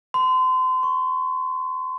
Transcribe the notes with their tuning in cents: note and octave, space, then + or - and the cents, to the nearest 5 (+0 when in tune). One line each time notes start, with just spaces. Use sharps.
C6 -35
C#6 -5